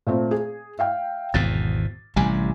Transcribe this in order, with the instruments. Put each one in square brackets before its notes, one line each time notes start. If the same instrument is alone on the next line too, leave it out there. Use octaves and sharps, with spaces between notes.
[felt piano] A#2 A3 C4
G#4
E5 F5 G5
[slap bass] G#1 E2 B2 [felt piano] A6
[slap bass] A1 C3 G3 [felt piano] G#5